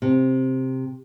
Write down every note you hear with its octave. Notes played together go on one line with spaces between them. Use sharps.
C3